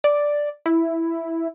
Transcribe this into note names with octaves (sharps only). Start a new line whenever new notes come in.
D5
E4